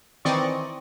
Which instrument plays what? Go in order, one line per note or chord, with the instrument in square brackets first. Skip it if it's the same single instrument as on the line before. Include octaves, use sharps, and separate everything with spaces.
[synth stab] D#3 E3 C4 D5 D#5 C#6